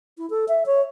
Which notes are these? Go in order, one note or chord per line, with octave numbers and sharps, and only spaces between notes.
E4
A4
E5
C#5